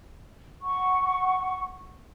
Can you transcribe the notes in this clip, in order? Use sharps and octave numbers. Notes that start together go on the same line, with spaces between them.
F#5 C#6